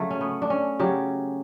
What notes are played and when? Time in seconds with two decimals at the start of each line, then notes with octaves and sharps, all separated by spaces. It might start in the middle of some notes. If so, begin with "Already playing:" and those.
Already playing: C#3 F#3 A3
0.11 C#4
0.21 B3
0.42 D4
0.50 C#4
0.79 C#3 F#3 G4